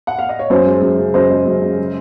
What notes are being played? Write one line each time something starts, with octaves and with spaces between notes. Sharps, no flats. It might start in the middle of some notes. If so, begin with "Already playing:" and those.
F#5
F5
D#5
C#5
F#2 C5
G#3
F#2
C#3
F#2 C5 D#5
G#3
F#2
C#3
G#3